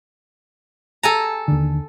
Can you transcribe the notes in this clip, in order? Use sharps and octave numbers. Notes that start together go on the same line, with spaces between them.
A4 G#5 A#5
D#2 D3